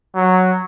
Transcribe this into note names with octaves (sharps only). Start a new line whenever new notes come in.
F#3